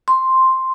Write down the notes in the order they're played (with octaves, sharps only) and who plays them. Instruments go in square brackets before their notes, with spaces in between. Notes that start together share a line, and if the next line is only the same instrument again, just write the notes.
[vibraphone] C6